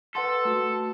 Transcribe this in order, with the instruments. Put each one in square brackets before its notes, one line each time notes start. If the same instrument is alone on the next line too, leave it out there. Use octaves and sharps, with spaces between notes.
[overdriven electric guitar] A4 [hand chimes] B4 F#5 C6
[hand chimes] A3 F#4